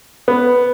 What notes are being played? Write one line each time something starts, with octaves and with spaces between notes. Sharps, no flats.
B3